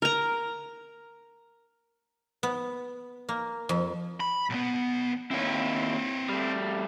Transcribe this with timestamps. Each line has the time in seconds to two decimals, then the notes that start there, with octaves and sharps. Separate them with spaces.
0.02 A#4 A#5
2.43 B3
3.29 A#3
3.69 F2
4.20 B5
4.50 B1 B3
5.31 D#2 C4 E4 C#5
6.29 G3 A3